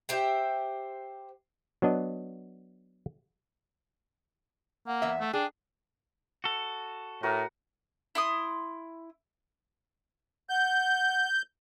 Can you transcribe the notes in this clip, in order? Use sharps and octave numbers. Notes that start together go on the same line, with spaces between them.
G4 C5 E5 G5
F#3 B3 D4 D#5
A#3 F#5
E2 E5
A3
D4 G#4 G5
F#4 A4
A2 F#4 A#4
E4 C6 D#6
F#5 G6